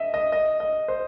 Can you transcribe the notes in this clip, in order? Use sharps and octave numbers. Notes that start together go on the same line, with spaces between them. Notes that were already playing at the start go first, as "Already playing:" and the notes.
Already playing: D#5 E5
D#5
D#5
D#5
C5